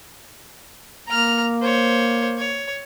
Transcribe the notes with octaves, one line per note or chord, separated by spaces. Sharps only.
A#3 A#5 F6
C5 C#5
C#5